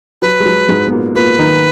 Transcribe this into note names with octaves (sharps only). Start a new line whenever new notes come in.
F#3 B4
G#3
F#3
G#2 G#3
B3
A#2 A#3
A#2 A#3 B4
D#3 D#4